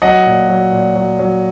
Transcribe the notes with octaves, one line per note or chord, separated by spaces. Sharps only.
F#3 D#5 F#5
A#2
F#3
A#2
F#3
F#3